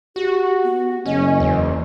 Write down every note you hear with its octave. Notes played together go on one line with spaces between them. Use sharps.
F#4 G4
B3
F#1 C#4 D#5
E2